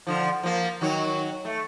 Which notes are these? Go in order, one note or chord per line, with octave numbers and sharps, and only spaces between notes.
D3 F3
F3 A#3
D#3 F#3 C#5
A3